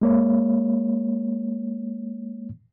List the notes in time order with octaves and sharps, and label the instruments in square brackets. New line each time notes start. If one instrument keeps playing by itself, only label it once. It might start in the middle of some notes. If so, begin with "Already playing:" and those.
[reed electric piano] G#3 A#3 C#5